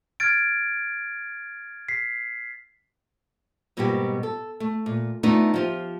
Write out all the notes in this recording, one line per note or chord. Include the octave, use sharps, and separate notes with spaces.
F6 G#6 A6 D7
B6 C7
G#2 B2 G3 A#3 B3 G4
A4
A3
A#2
A3 B3 D4 D#4 F4
F3 F4 G4